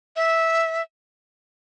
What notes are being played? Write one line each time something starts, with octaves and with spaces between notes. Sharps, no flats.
E5